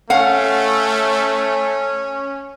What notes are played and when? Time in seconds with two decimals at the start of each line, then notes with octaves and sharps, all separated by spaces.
0.10 A3 C#4 F5 F#5